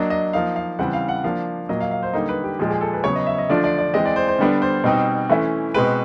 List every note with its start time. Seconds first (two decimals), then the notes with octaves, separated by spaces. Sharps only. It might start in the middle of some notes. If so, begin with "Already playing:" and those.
Already playing: F#3 A#3 D4 D#5
0.10 D#5
0.33 F3 A#3 D#4 F5
0.56 F5
0.79 C#3 E3 G3 C4 F#5
0.93 F5
1.09 F#5
1.24 F3 A#3 D4 F5
1.69 A#2 F#3 A#3 D#5
1.81 F5
1.91 F5
2.03 C5
2.13 D3 G3 A#3 D#4
2.29 B4
2.44 G4
2.59 A#2 F3 G#3 G4
2.70 G#4
2.81 A4
2.93 B4
3.04 C#3 F#3 B3 C#5
3.16 D#5
3.27 E5
3.38 D#5
3.49 D3 F3 A3 D4 F4 D5
3.64 D5
3.78 D5
3.94 E3 G#3 C4 D#5
4.05 D5
4.16 C5
4.28 C5
4.39 D3 G3 B3 D4
4.62 C5
4.84 B2 G3 C4 D#4
5.29 E3 A3 C#4 E4
5.74 B2 G#3 C4 B4